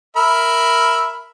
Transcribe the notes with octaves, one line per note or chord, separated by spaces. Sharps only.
A#4 E5 B5